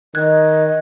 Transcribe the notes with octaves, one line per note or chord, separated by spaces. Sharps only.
D#3 D#5 F#6 G#6